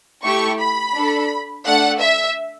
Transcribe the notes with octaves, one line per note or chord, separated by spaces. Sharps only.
A3 E4 G4 C#6
B5
D4 A4
A3 D4 A4 F#5
E5